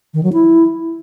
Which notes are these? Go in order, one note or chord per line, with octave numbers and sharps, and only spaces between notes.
D#3
F#3
E4